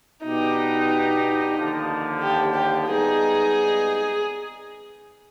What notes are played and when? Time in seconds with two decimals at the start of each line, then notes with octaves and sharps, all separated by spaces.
0.25 B2 B3 D4 D#4 G4 B4
1.56 D#2 D3 F3
2.21 G4
2.54 G4
2.86 G#2 G3 B3 D#4 G#4